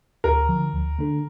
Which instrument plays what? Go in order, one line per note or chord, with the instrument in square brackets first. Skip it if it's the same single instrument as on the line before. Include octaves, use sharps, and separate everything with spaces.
[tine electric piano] D2 [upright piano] A#4
[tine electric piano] D3 F3
D2
D3 A3 D4 A4